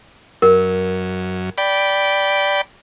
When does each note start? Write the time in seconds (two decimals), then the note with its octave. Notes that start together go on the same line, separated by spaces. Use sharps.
0.42 F#2 A#4
1.58 D5 G5 B5